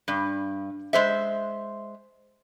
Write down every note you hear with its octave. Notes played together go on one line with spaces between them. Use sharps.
G2
G#3 C5 E5